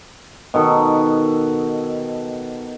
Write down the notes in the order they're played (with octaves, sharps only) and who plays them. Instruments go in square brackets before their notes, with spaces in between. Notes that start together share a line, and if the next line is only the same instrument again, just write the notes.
[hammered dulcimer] B2 D#3 A4